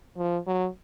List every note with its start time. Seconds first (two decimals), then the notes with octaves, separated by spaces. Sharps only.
0.17 F3
0.47 F#3